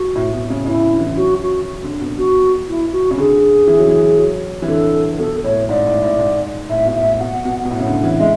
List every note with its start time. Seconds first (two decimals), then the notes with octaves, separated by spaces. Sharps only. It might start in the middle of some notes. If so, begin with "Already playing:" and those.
Already playing: F#4
0.15 A2
0.33 B2
0.50 C#3
0.66 C#3 E4
0.91 D3
1.00 E3
1.07 D3
1.16 F#3 F#4
1.42 F#4
1.84 D3
2.01 B2
2.17 F#4
2.68 E4
2.92 F#4
3.11 C#3
3.17 D3 G#4
3.68 E3
3.78 F#3
3.88 E3
4.18 F#3
4.62 E3
4.68 D3 A4
5.19 B2 A4
5.44 A2 C#5
5.69 G#2 D5
5.86 A2
6.03 A2
6.19 G#2
6.69 A2 E5
6.86 B2
6.95 E5
7.03 A2
7.20 B2 F#5
7.45 B2
7.65 B2
7.70 A2 F#5
7.80 C#3
7.86 D3
8.04 E3
8.20 G#3 E5